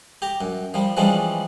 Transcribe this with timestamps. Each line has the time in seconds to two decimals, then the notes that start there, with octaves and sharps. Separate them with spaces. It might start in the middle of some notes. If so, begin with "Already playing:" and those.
0.22 G4 A#5
0.41 F#2
0.74 F3 G3
0.97 E3 F3 G3 G#3 C#4 D4